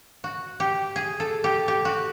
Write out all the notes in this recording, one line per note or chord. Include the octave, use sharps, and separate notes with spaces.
F#4
G4
G#4
A4
G4
G4
F#4